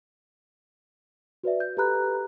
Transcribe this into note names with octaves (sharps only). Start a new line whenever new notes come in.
F#4 B4 D5 E5
G6
G4 A4 B4 A#5 B5 F#6